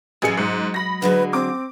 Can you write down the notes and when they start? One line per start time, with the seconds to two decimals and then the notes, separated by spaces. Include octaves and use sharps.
0.22 A1 F#3 G#3 G#4 C#7
0.37 G#2
0.74 B5 A#6
1.02 D3 F#3 G#3 B4
1.33 C4 D6